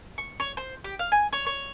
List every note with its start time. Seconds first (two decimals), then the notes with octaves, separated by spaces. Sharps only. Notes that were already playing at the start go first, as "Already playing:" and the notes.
0.18 C#6
0.40 C#5
0.57 C5
0.84 G4
0.99 F5
1.12 G#5
1.33 C#5
1.46 C#5